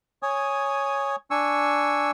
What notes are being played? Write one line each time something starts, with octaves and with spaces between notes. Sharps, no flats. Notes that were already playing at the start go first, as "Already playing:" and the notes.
C#5 G#5 D#6
D4 G#5 C#6 E6